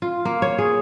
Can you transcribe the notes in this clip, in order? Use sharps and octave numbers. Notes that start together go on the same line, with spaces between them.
F4
A#3
C#5
G#4